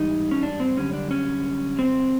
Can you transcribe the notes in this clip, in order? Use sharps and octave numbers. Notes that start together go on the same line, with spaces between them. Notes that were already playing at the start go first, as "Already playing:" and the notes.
Already playing: G#2 E3 G3 D#4
C#4
D4
C4
F#2 D3 G3 C#4
D4
C#4
C4